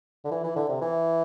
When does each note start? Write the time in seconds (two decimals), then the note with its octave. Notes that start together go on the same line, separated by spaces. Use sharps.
0.24 D3
0.31 E3
0.44 E3
0.56 D3
0.69 C3
0.81 E3